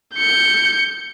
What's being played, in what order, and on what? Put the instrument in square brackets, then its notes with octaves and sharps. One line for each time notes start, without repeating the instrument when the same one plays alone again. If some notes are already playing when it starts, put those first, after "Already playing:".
[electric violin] G6 C#7